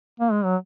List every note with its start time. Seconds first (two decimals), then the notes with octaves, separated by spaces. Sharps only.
0.20 A#3
0.32 G#3
0.44 F#3